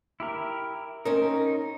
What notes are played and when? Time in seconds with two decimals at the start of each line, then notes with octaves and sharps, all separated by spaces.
0.20 E4 G4 A#4
1.05 C4 C#4 D#4 A#4